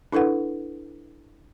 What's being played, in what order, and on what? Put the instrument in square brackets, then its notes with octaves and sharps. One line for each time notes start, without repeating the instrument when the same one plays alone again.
[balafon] D4 E4 A4 B4 F#5